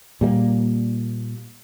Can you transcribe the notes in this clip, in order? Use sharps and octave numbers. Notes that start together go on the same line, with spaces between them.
A#2 G3 G#3 A#3